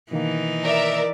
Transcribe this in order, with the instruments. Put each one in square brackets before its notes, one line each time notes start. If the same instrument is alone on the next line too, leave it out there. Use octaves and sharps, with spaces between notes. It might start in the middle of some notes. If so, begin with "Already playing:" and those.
[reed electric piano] B2 D#3 A#3 [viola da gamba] E3 D#4
[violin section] A#4 E5 [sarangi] D5